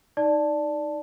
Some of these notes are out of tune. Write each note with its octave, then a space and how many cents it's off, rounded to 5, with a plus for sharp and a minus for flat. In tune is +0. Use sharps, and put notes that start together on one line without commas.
D#4 +0 D5 +0 A5 +0